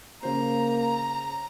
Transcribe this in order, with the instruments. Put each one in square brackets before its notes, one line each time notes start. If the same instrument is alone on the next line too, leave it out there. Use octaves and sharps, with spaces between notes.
[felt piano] C#3 C5 [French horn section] A#3 [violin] A#5